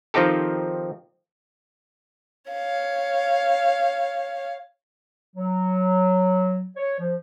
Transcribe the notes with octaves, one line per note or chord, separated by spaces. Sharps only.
D#3 F3 C4 D#4 G4 A4
C#5 F5
F#3
C#5
F3